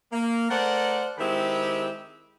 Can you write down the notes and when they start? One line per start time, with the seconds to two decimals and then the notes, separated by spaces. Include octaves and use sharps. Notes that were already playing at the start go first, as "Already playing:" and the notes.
0.13 A#3
0.50 A3 A#4 C5 D5 F#5
1.18 D#3 G#3 C4 E4 G4 B5